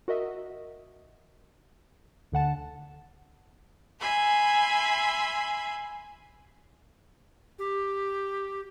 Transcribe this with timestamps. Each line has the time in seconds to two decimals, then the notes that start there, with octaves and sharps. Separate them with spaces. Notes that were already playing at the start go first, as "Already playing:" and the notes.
0.08 F#4 A#4 D#5 E5
2.32 D2 D3 F#5 A5
3.99 E5 G#5 B5 C6
7.59 G4